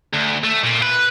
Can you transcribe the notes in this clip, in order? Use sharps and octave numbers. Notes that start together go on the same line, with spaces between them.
D2
A3
A#2
B4